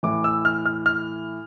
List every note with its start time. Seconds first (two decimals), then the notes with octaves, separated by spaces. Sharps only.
0.03 A2 E3 D6
0.24 E6
0.45 F6
0.65 F6
0.86 F6